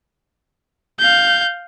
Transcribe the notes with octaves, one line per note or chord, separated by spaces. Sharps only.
F5 G6